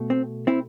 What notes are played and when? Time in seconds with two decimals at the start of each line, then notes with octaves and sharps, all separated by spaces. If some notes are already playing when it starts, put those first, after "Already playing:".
Already playing: B2 A3
0.10 C4
0.47 C4 E4